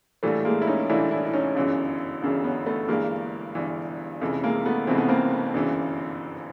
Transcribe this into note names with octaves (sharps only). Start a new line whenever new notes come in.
A#1 A2 E3 G3 A3
G#3 A#3
E4
C#4 D#4
A#1 A2 E3 D4 E4
D4 E4
E4
C#4 D#4
G1 F#2 C#3 E3
G1 F#2 C#3 E3
B3 C#4
A3 B3
G1 G2 E3 G#3 A#3
G1 G2 E3
F1 F2 C#3 E3
G#3 A#3
A3 B3
F1 F2 C#3 E3 C4
B3
A#3 C4
G1 F#2 C#3 E3